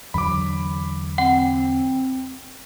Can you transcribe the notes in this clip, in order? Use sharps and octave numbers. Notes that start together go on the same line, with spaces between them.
E2 D3 F#3 B5 D6
C4 F#5